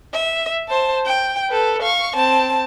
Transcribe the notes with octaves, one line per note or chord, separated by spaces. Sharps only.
E5
C5 A5
G5
A4 B4
F5 C#6
C4 A5